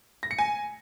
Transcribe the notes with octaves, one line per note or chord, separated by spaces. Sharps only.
A#6
C#7
G#5